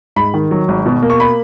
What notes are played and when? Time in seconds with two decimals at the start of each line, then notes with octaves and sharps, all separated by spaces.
0.16 G#2 B5
0.34 D#3
0.51 F#3
0.68 G#1
0.86 B2
1.02 A#3
1.10 C#6
1.20 B5